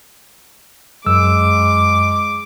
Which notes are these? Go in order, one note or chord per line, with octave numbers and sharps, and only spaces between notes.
F#2 G#3 D6 E6